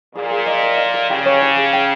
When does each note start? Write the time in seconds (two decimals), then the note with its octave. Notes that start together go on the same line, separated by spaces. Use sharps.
0.15 A#2 G#4
0.31 G#4
0.46 D#5
0.63 A#4
0.78 F5
0.94 A#4
1.10 C#3 G4
1.26 C#5
1.42 G4
1.57 G#4
1.73 G5